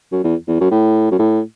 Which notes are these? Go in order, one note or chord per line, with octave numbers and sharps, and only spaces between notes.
F#2
E2
E2
F#2
A2
F#2
A2